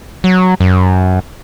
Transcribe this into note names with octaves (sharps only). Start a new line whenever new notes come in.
F#3
F#2